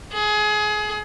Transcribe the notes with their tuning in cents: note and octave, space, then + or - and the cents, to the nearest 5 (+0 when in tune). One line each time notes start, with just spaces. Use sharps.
G#4 +25